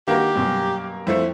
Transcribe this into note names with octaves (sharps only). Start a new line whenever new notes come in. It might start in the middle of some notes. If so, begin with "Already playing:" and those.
D#3 A#3 F#4 G4 A#4
F#2 B2 G3
F2 A3 C4 E4